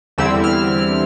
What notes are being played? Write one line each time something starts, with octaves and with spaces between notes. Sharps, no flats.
E2 D3 G3 C4 E4 E6
F6